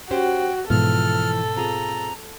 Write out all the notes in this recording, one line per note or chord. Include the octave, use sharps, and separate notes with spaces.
C#4 F#4 G4 C5 G5
G#2 B2 E3 F3 F4 A4 F6
C4 F4 G#4 A#5